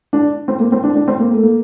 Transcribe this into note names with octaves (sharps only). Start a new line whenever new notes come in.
D4
C4
A#3
C4
D4
D4
C4
A#3
A3
A#3